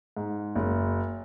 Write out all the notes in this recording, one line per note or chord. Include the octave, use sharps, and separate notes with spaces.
G#2
F#1